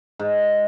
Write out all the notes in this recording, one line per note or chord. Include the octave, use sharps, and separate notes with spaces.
G#2